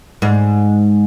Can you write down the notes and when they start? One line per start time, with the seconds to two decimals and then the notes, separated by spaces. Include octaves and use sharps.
0.22 G#2